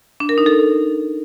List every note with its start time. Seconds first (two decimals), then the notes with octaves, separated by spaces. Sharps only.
0.20 D4
0.29 A#4
0.38 D#4
0.46 A4